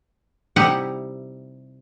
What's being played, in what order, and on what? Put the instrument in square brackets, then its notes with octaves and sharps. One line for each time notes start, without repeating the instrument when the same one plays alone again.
[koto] C3 G3 D#4 E4 F#5